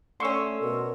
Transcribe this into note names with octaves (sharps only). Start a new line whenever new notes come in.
D3 A3 C#4 C6 C#6 E6
B2 A#4